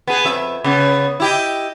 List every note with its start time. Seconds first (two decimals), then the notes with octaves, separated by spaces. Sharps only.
0.07 B3 G#4
0.25 F2 E5
0.64 C#3 B3
1.20 E4 G4 D#5